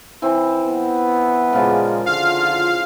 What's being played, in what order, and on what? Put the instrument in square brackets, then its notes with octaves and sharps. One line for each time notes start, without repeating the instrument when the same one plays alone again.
[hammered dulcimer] E3 C4
[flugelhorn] B3
[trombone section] A#2 G#3 A#3 [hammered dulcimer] C#3 F3
[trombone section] D3 F4 [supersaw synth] F5